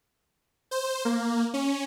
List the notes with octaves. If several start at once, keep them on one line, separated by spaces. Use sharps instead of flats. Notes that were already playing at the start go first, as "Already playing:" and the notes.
C5
A#3
C#4